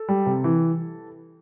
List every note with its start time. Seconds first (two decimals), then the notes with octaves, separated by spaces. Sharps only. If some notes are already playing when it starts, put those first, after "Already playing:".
Already playing: A4
0.08 G3
0.26 C3
0.44 E3